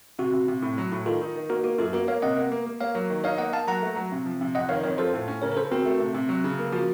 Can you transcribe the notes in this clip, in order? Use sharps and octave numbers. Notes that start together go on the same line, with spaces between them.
C3 F#4
C3
C3
A2
F#3
A2
D#3 F4 A4
D#4
D#3
A#3 F#4 A#4
A#3 F#4
F#2 F4 A4
A#3 F#4 A#4
A#3 C#5 F5
C3 D#5 F#5
A#3
A#3
A#3
A#3 C#5 F5
F#3
D#3
D#4 C#5 F5
A#3 D#5 F#5
A#3 F5 A5
F#3 F#5 A#5
A3
F#3
C3
F3
C3
F2 D#5 F#5
D#3 C#5 F5
F2 A#4 C#5
F4 A4 C5
A2
C#4
C#3 A#4 C#5
A#4
C#3 A4 C5
C4 F#4 A#4
A3
C3
C3
F#3
C#3
A#3
F3 F#4